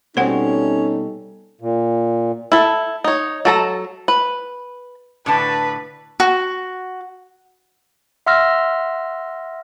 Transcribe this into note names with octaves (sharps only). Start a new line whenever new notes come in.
B2 G3 C4 C#4 D#4 A4 C5 F#5
A#2
E4 A4
D#4 C#5
F#3 A4 A#5
B4
A2 D3 B4 A5
F#4
E5 F#5 C6 E6 F6 A#6